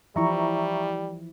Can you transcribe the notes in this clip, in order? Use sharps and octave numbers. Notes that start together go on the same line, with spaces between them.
E3 F3 G3 E4 E5 A#5 C#6